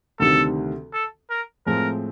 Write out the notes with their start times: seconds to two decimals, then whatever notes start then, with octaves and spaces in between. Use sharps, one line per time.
0.20 D2 C3 D#3 G3 C4 A4
0.94 A4
1.30 A#4
1.66 A2 F3 G#3 C4 A#4